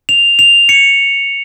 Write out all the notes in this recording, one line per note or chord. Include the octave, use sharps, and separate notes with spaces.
F7
F7
C#7